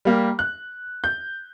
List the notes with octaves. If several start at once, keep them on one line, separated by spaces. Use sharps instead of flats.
G3 A#3 G4
F#6
G6